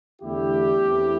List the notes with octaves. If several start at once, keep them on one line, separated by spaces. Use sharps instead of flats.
E2 D3 A3 E4 G4
E2 E3 A3 C4 E4